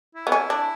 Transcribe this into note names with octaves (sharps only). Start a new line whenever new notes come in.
E4
B3
C#4
D4